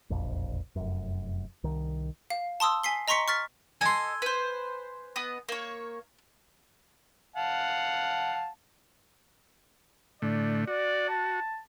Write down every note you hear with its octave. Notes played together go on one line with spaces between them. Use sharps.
E1 A#1 F2
F1 F#2
C2 D#3
F5
A5 C6 D#6 E6
G#5 B6 C7 G7
D#5 A#5 C6 C#6 B6 C#7
C#6 F6 A6 B6
A4 D#5 G#5 C6
B4 C5
B3 D#5 D#6
A#3 C#5
F5 F#5 A5
A2 D3 A3 D5
F#4 D5
A5